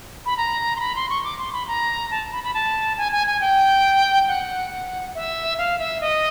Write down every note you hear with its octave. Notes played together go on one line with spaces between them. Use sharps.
B5
A#5
C6
B5
C6
C#6
D6
C6
B5
A#5
A5
B5
B5
A5
G#5
G#5
G#5
G5
F#5
E5
F5
E5
D#5